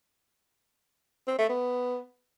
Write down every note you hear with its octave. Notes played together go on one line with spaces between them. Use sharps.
C4
A3
B3